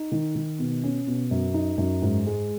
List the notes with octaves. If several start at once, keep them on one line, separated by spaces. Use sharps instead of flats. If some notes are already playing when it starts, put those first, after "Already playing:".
Already playing: D#4
D#3
D#3
B2
C#4
B2
F#2
D#4
F#2
G#2
G#3